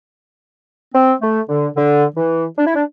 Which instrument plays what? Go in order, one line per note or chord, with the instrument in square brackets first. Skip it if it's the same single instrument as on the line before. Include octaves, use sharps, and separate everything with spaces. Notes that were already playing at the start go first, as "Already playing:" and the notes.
[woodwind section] C4
A3
D3
D3
E3
D4
E4
D4